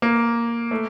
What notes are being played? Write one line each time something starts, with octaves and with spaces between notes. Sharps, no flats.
A#3
A3